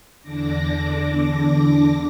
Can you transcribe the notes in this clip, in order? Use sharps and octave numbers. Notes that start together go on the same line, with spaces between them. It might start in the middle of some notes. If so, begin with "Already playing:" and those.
E2 D3 D4 D6 A#6